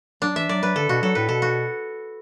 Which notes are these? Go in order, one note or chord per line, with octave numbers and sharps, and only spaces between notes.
F#3 D4
E3 E5
F#3 D5
F#3 B4
D3 A4
B2 F#4
F#3 A4
A2 B4
B2 A4
F#4